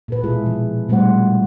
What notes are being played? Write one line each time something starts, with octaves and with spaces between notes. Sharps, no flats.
A#2 A4 B4
B2 G#3 E4 F4 G#4 A4
F3
A#2 G3 A3 C4 C5 F#5